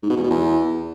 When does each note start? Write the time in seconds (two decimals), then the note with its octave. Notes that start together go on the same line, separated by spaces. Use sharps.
0.03 G#2
0.10 B2
0.17 E2
0.24 B2
0.31 E2